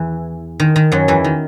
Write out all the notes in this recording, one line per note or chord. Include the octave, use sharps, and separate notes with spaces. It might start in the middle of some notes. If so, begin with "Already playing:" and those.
Already playing: E2 E3
D#3
D#3
F#2 F#3
E2 E3
D#3